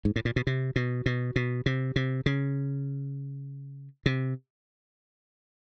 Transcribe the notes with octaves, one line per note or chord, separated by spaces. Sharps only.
G#2
A2
A#2
B2
C3
B2
B2
B2
C3
C3
C#3
C3